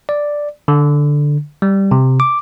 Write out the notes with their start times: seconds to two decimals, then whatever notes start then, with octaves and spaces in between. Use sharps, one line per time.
0.09 D5
0.68 D3
1.62 G3
1.91 C3
2.20 D6